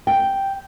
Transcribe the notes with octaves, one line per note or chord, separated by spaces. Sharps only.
G5